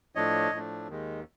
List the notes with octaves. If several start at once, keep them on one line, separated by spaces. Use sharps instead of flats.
A2 F3 A3 D4 C#5 D#5
A2 F3 A3 D4
D#2 D#3 G#3